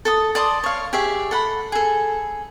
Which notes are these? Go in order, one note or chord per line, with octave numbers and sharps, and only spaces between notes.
A4 A5 D#6
D5 A5 C6 D#6
C#5 F5
G4 G#4 C#5 E5
A4 F#5 B5
G#4 A4